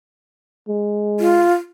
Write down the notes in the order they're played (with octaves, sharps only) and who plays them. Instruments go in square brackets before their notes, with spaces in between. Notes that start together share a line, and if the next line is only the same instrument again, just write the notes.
[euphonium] G#3
[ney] F4